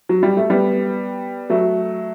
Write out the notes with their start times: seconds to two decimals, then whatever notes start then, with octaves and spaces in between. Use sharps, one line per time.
0.09 F#3
0.23 G3
0.37 A3
0.50 G3 B3
1.50 F#3 A3